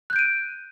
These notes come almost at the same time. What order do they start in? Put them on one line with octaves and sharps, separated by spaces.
F#6 G6 D7 D#7